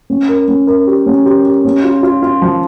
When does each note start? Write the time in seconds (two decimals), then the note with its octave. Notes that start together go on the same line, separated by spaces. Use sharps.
0.10 C#4
0.29 A#4
0.48 C#4
0.67 A#4
0.87 G4
1.06 C#4
1.25 G4
1.45 G4
1.65 C#4
1.84 F4
2.03 F4
2.22 F4
2.42 F3